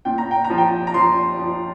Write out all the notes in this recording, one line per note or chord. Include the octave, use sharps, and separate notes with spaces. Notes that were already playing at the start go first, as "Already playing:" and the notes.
A#2 G5
A#5
G5
A#5
F3
G5
A#5
F3 C6
F3